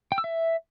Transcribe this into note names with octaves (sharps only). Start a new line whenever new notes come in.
G5
E6
E5